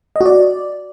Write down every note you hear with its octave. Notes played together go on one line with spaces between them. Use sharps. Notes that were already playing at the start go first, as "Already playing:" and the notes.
D#5
F#4
D5